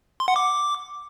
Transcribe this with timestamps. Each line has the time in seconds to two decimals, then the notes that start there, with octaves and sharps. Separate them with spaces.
0.20 C6
0.28 F#5
0.36 D6